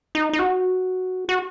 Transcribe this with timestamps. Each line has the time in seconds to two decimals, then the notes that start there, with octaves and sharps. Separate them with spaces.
0.15 D#4
0.33 D#4
0.39 F#4
1.29 F#4